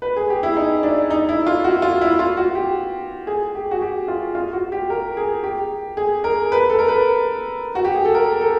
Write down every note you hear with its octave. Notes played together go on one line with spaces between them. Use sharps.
B4
G#4
G4
E4
D#4
D4
D#4
E4
F4
F#4
F4
E4
F4
F#4
G4
G#4
G4
F#4
G4
F4
F4
F#4
G4
A#4
G#4
G4
G#4
A#4
B4
A4
A#4
B4
F#4
G4
G#4
A4
A#4
A4